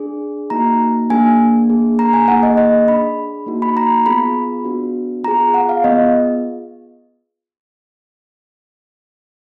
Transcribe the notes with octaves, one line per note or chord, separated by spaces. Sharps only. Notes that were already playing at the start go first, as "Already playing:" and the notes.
Already playing: D4 G#4
A#3 D#4 F#4 A#5
A#3 D4 G#4 G#5
A#3 D4 G#4
A#5
G#5
A#3 D#4 G#4 F#5
D#5
D#5
D4 G#4 B5
A#3 D#4 F#4
B5
A#5
B3 F4 G#4 B5
B3 D4 F#4
B3 F4 G#4 A#5
F#5
F5
B3 F4 G#4 D#5